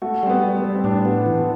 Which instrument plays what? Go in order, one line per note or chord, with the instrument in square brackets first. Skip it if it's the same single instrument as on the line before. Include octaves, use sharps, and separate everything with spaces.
[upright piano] A3 [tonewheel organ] F#4
[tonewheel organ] G3 [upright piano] C4
[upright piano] B3
[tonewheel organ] G3
[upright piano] B3
[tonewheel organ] G3
[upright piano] C4
[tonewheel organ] A2 [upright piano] D4
[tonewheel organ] B3
E3